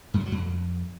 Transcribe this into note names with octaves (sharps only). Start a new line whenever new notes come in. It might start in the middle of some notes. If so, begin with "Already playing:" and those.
F#2
G3
F#3
F2